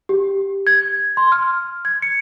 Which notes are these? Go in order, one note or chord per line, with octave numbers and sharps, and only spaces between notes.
G4
G#6
C6
F6
G#6
C#7